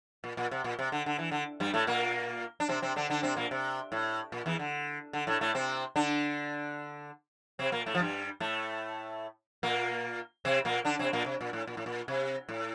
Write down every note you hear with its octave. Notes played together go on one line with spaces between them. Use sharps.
A#2
A#2
C3
A#2
C3
D3
D3
E3
D3
G2 G3
A2 A3
A#2 A#3
D4
C3 C4
C3 C4
D3 D4
D3 D4
C3 C4
A#2 A#3
C3
A2
A#2
E2 E3
D3
D3
A2 A3
A2 A3
C3 C4
D3 D4
C3 C4
A#2 A#3
A2 A3
F3
G2 G3
A2 A3
A#2 A#3
C3 C4
A#2 A#3
D3 D4
C3 C4
A#2 A#3
C3
A#2
A2
A#2
A2
A#2
C3
A2